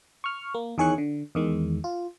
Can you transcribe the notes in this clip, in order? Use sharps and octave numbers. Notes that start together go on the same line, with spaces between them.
C#6 F6
A#3
E2 D#3 G#4 C#5 C#6 F#6
D3
E2 D#3 G#3
F4